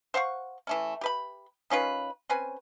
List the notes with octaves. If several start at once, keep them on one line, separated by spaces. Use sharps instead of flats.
C5 F5 F#5 C#6
E3 A3 C#4
G4 B4 B5
D#3 C#4 F4 B4
C4 C#4 B4 G#5